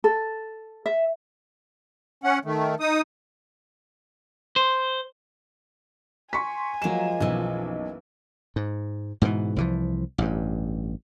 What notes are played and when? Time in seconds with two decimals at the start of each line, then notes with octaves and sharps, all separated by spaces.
0.04 A4
0.86 E5
2.24 C#4 F#5
2.45 D#3 A3
2.80 D#4 D#6
4.56 C5
6.33 G#5 C6 C#6 B6
6.82 F3 F#3 G#3 A#3 E7
7.20 B1 F#2 E3
8.56 G#2
9.22 G#2 B2 D#3 E3
9.56 C2 E3 F3
10.18 A1 G2